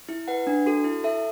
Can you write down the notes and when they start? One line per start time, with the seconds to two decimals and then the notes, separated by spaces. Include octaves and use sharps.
0.09 E4
0.28 B4 F#5
0.47 D4
0.66 F#4 A4
0.84 E4
1.04 A4 E5